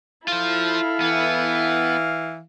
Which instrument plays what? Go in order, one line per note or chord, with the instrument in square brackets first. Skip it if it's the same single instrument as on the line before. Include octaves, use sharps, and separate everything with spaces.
[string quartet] E4 A4 [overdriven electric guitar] F4 C5 [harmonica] F5
[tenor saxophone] E3 [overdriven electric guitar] B3